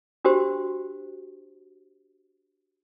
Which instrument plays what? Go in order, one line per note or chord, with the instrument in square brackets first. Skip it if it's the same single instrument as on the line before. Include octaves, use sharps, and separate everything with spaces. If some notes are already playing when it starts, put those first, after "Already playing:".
[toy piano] D4 F#4 G4 C5